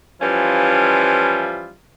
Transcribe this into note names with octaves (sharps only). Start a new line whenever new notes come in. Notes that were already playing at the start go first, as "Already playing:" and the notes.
E3 F3 G3 C#4 E4 F4